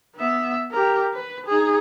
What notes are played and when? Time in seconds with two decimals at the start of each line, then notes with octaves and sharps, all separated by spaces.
0.16 B3 E5
0.71 G4 A#4
1.14 B4
1.46 D#4 G#4